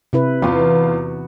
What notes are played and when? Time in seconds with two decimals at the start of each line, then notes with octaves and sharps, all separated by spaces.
0.13 C3 E4 B4
0.42 E2 E3 B3 F4 F#4